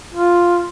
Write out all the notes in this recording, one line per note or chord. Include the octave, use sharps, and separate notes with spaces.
F4